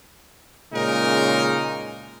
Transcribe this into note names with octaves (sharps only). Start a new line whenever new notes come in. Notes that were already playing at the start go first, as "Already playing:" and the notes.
A#2 C#3 G#3 C#4 D#4 A#4